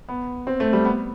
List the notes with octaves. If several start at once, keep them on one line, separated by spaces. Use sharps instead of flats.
B3
C4
A3
G3
B3